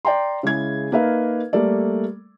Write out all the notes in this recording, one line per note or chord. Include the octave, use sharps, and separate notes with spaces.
D5 G5 A#5 C6
C#3 G#3 E4 G#6
A#3 D#4 B4 E5 F5
G3 A3 A#3 A4 D5